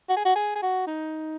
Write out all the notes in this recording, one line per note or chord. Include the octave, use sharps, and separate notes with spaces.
F#4
G#4
F#4
G#4
G#4
F#4
D#4